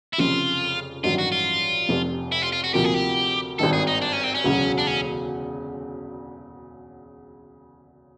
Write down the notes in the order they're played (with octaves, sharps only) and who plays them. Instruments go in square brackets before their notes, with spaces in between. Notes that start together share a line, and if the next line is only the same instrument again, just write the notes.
[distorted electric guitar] E4
[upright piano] F1 F2 C#3 F3 [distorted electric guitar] F4
[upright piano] A1 G2 D#3 F#3 [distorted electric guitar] F4
[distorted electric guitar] F#4
F4
[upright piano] F1 F2 C3
[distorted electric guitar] E4
F4
F4
F#4
[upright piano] D2 C3 F3 A#3 [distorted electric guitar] G4
[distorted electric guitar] G#4
G4
[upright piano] G#1 G2 D#3 [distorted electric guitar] A4
[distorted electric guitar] G#4
D#4
D4
C#4
C4
C#4
[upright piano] E1 D2 C#3 F#3
[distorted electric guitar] D4
C#4